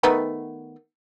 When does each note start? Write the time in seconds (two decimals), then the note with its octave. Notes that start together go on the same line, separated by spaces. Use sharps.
0.03 D#3 A3 B3